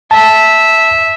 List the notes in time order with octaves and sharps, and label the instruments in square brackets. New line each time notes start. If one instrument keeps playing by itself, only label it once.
[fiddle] E5 [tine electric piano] A5